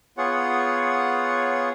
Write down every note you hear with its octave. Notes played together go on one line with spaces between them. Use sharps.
B3 F4 G#4 C#5 F#5